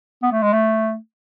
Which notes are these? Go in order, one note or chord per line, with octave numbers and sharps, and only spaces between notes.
B3
A3
G#3
A3